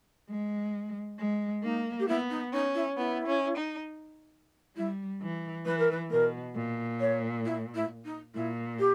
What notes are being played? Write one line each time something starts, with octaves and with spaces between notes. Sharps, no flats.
G#3
G#3
A#3 D#4
G4
B3 E4
D#4
C#4 D#4
E4
B3 E4
C#4
D#4
G3 E4
E3
E3 B4
A#4
B4
B2 A#4
A#2
C#5
E4
E4
D#4
A#2 E4
G4